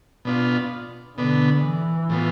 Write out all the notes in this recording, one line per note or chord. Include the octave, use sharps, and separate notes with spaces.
B2 B3 D4 F4
B2 D3 B3 D4
E3
A2 F3 B3